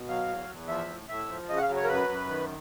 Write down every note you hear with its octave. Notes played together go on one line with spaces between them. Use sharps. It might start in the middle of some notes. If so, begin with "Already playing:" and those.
Already playing: B2
F#3 F5
E2
E2
F3 E5
A2
A2 E5
F3
C#3 D#5
F#5
F5
F#3
C#5
A#4
F#2 B4
F#2
D#3